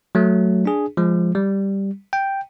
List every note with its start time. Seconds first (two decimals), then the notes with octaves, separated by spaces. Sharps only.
0.15 F#3 A3
0.66 D4 G#4
0.97 F3 G#3
1.35 G3
2.13 G5